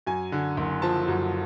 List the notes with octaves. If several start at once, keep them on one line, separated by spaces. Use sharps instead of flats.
F#2 G#5
D3
F#1
F3 A5
F#2